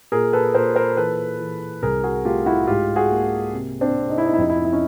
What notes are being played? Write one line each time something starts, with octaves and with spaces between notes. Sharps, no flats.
A#2 G#4 A#4
A4 B4
A#2 A#4 C5
A#4 C5
E3 A4 B4
E3
C2 G#4 A#4
F#4 G#4
A3 F4 G4
E4 F#4
G#2 F4 G4
F#4 G#4
A#3
C3
C4 D4
C3
D#4
E4
D#4
E4
F2 D#4
E4
D#4
E4
C#4 D#4